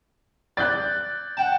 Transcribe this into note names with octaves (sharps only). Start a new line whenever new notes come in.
D5 F#6 G6 A6
F#5 G5 A5